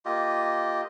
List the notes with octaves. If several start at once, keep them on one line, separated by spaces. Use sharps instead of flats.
A#3 F4 G4 D#5